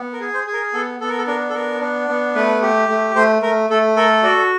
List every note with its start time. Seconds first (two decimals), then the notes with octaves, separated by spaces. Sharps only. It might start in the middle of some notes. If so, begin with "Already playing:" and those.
Already playing: B3
0.13 A#4
0.20 G#4
0.33 C5
0.47 G#4
0.53 A#4
0.73 B3 A4
1.00 B3 A4
1.09 A#4
1.18 A4
1.27 D4 A#4
1.49 A4
1.54 B3 A#4
1.81 D4
2.08 B3
2.35 A3 B4
2.62 G4
2.89 A3
3.15 A3 C5
3.42 A3 A#4
3.70 A3 A4
3.96 A4 A#4
4.23 F#4 D5